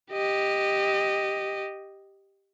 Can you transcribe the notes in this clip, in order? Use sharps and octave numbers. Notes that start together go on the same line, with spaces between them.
G4 D#5